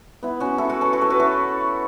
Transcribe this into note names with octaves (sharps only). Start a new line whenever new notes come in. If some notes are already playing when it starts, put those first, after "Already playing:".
B3 E4
C#4 F#4
E4 A4
F#4 B4
A4 C#5
F#4 B4
A4 C#5
F#4 B4
E4 A4